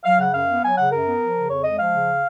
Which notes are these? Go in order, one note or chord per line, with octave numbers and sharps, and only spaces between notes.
F#3 F5
C#3 F#5
F#2 F5
B3
F#3 G#5
C#3 F#5
F#2 A#4
B3
F3
C#3
F2 C#5
G#3 D#5
F3 F5
C#3